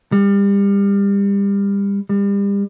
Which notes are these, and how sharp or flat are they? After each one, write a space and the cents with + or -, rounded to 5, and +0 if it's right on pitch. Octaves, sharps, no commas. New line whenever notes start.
G3 +30
G3 +35